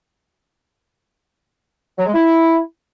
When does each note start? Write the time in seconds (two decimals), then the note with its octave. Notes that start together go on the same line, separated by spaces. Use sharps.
1.98 F#3
2.06 G#3
2.14 E4